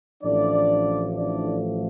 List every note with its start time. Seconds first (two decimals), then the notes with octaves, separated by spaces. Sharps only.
0.22 A1 A2 F3 A3 D4 D5
1.17 D4 D5